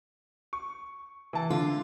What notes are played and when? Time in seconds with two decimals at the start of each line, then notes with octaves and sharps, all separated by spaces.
0.53 C#6
1.33 E3 A5
1.50 D3 F4